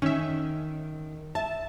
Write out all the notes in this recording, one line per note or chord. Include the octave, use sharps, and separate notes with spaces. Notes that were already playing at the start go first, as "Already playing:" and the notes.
D#3 C#4 E5
E5 A5